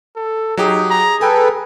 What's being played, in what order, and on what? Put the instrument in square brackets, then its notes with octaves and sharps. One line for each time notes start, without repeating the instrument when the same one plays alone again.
[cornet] A4
[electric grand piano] F#3 G4 [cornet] D#4 [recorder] G#4
[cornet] A#5
[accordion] A4 B4 [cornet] G5 [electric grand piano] G#5